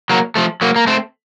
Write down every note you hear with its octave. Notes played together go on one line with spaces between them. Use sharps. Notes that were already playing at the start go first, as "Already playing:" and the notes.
F#3 A#3
F3 A3
F#3 A#3
A#3
A3 C4